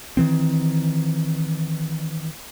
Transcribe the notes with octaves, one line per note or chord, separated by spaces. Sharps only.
D#3 E3 C4